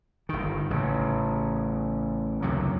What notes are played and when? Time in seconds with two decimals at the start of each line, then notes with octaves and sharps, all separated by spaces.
0.29 G1 D#3
0.70 A1 C#3
2.42 C#2 F#2 C3 F#3